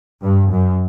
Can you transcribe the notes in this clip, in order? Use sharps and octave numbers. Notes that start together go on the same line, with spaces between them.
G2
F#2